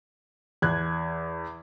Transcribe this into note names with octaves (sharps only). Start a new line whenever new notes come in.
E2 F#6 G#6